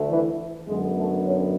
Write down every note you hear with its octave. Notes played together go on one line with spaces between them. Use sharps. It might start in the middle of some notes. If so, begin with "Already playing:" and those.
Already playing: D2 D3 A3
E3 E4
F#2 D3 F#3 G#3 B3 G#4
A3 A4
C#4 C#5